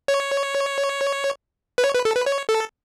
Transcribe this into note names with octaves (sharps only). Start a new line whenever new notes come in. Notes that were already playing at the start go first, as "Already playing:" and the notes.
C#5
B4
C#5
B4
A4
B4
C#5
A4